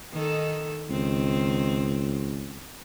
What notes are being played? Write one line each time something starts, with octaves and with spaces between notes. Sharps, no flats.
D#3 D#4 A4
C#2 D#3 C4